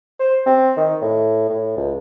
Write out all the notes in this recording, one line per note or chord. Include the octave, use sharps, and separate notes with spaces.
C5
C4
D#3
A2
A2
C#2